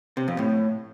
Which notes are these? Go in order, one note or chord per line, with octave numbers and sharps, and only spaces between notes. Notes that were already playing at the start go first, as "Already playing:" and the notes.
C3
F2
A2